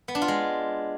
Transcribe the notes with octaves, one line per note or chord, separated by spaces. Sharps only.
B3
D4
F4
G#3